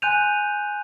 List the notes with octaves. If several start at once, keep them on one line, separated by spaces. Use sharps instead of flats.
G#5 C6 F#6 G6 D#7 F7